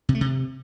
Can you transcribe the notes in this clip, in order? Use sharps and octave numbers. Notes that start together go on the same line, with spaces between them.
C3
A3
C3